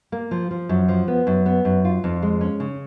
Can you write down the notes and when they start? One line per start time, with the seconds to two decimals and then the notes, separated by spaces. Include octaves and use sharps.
0.12 A#3
0.31 F3
0.51 F3
0.69 F#2
0.88 F3
1.08 B3
1.27 F#2
1.46 B3
1.65 F#2
1.85 F4
2.04 F2
2.22 G#3
2.41 C#4
2.60 C#3